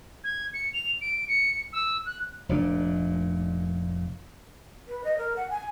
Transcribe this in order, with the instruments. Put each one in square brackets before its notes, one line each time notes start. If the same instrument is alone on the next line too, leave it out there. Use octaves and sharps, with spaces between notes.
[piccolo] G#6
C#7
F7
D7
C#7
E6
F#6
[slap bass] F1 A#2 D4
[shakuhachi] B4
D#5
A#4
F#5
G#5